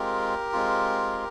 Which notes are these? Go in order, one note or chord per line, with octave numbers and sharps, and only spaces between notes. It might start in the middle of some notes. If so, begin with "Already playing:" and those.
Already playing: G#3 C4 F4 G4 A#4
G#3 C4 F4